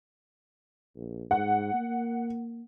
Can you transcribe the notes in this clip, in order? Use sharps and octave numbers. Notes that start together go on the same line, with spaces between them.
A#1
G#2 F#5
A#3